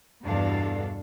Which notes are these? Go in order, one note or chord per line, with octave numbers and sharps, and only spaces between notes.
E2 G2 B2 D4 A4 F5